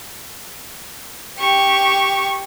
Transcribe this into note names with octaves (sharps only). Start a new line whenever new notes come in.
G4 C#6